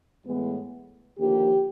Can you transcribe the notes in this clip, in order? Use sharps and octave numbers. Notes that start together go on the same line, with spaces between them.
A2 E3 G#3 B3
D#2 D3 F3 A#3 G4